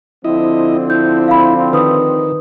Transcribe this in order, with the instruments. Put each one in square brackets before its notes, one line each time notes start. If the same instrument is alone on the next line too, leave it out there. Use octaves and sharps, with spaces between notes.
[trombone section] D3 F3 C4 [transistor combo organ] E4 D#5
[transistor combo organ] E4 [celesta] G6
[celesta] F5 B5
[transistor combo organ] D#3 [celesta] B4 D#6